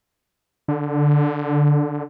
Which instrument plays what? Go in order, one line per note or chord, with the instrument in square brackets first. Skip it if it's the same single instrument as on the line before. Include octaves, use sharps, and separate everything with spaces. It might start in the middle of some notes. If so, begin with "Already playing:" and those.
[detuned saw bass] D3